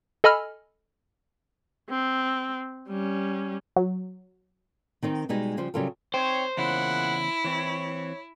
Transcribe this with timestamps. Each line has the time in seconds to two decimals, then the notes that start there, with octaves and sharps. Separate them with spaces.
0.24 A4 D#5 G#5 B5 E6 F6
1.90 C4
2.88 G3 C#4
3.76 F#3
5.03 D#3 C4 D#4 A#4
5.29 B2 G3 G#3 D#4
5.57 C#3 F3 G3 C5
5.74 C#3 F#3 G3 F4 A4 A#4
6.14 C4 D#4 C5 C#5 G5
6.58 E2 A#2 C#3 G#3 E4 C#5 F#5
7.44 E3 C4 C#5